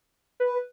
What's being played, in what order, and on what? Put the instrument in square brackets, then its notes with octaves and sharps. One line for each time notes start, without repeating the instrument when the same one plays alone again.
[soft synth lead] B4